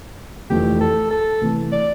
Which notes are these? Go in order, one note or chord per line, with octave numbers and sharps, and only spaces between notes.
F1 F2 E3 A3 G4
A4
A4
C3 E3 A3
D5